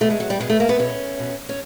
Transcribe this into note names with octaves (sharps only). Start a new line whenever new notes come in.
B2 A3
G#3
F#3
G3
B2 G#3
A3
A#3
B3
B2 C#4
B2
C#4